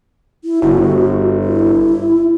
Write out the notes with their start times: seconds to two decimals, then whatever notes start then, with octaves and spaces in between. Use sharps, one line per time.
0.44 E4
0.62 G1 F#4
1.43 E4